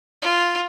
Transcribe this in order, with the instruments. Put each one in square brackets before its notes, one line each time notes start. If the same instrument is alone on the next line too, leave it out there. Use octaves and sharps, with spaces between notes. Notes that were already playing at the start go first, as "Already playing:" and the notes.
[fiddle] F4